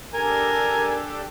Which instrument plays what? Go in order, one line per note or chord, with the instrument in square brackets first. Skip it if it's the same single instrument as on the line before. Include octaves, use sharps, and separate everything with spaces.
[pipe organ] D4 G4 A4 [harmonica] A#4 [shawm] G#5